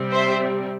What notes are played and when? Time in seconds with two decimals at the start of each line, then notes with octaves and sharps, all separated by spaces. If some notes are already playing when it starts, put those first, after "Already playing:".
Already playing: C3 G3 C4
0.12 C5 E5